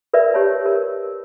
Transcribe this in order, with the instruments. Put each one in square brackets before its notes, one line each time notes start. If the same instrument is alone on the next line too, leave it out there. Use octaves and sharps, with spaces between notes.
[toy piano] A#4 B4 D5 E5
G4 C#5 A5
A#4